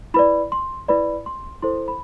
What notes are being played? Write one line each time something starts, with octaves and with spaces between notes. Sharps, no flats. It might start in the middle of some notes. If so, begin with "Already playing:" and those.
E4 B4 D5 B5
C6
E4 B4 D5 B5
C6
E4 A4 C5 C6
B5